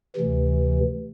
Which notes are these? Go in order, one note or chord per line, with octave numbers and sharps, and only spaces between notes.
D2 C3 E3